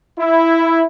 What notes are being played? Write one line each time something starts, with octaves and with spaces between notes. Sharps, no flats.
E4